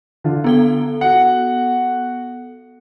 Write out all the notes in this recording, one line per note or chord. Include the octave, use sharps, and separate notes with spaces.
D3 F4
B3 A4 G7
F#4 F#5